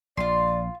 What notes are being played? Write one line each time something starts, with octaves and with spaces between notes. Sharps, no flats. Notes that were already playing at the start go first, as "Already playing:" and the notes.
A#1 F4 D5 C6